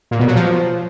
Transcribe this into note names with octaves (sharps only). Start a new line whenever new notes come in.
A#2
B2
F#3
F3